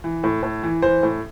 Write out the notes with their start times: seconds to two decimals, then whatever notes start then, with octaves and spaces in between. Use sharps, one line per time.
0.04 E3
0.24 A2
0.43 A2
0.63 E3
0.82 E3 C5
1.03 A2